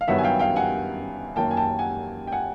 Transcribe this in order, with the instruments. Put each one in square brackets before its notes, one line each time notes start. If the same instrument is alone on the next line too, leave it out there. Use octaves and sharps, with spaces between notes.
[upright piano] F5
G2 D#3 F#3 B3 E5 F#5
G#5
F5 G5
F5 G5
F#5 G#5
F#2 D#3 F#3 A#3 G5 A5
G#5
G5 A5
F#5 G#5
G5
F#5 G#5